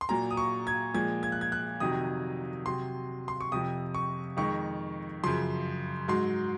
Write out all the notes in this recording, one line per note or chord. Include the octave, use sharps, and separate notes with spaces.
C6
A#2 F#3 A#5
D#6
C#6
G#6
A#2 F3 G#3 G#6
G#6
F#6
G#6
F#6
F2 C3 D#3 F#3 D#6
C3 F#3 C6
C6
C#6
F2 C3 F3 D#6
C#6
F2 D#3 G#3 C#6
F#2 C#3 F3 C6
G#2 F#3 C6